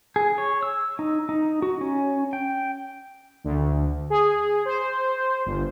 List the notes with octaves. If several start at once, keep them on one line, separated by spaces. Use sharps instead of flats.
G#4
C#5
E6
D#4
D#4
F#4
C#4
G5
D2
G#4
C5
G1